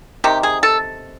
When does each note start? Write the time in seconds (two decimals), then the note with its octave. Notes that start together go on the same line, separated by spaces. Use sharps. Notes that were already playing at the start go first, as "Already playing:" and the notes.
0.24 C3 D#3 G4
0.43 G#4
0.63 A4